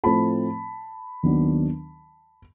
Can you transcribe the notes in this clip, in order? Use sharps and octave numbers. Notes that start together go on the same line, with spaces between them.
A2 F3 A3 C4 A5 B5
D#2 D#3 F#3 B3 D4